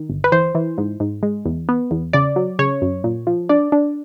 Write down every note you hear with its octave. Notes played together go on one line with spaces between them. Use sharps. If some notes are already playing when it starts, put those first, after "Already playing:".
Already playing: D#3
G1
B4
E3 C5
E3
G#2
G#2
G#3
E2
B3
E2
C#3 D5
F#3
C#3 C#5
F#2
A#2
F3
D4 D5
D4